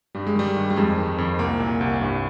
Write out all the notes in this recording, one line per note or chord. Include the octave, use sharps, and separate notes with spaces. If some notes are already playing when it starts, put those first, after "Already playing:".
G2 G3
G#3
D#3 G3
G2
G3
F2 G#3
D#3
F2
C2 A#3
A#2
C2
G2